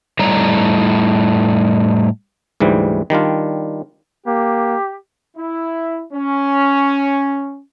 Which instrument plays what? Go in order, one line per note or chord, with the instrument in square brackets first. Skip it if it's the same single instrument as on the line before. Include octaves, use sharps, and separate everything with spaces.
[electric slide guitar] A2 G3 D#4 C#5 A#5
[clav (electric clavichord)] D2 G#2 E3 G3
D#3 G3 D4 F4
[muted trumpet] A#3 [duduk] G4
[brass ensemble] E4
C#4